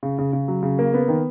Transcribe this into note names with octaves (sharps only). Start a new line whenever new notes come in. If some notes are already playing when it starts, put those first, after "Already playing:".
C#3
C#3
C#3
F#3
C#3
A#3
B3
D#3